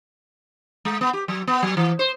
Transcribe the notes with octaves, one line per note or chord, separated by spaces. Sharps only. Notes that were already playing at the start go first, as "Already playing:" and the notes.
G#3
B3
G4
F#3
B3
F#3
E3
C5